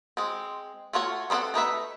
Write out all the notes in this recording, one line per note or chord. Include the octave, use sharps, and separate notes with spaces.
G#3 C4
A3 F4 F#4 C#5
B3 C4 E4 A4 F#5
A3 D#4 B4 E5